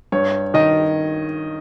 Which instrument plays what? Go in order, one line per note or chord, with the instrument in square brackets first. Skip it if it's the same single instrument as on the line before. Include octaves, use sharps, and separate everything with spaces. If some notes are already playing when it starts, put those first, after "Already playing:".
[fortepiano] G2 [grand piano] C#5
[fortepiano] D#3 [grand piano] D#5